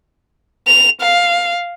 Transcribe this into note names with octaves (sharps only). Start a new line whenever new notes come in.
F7
F5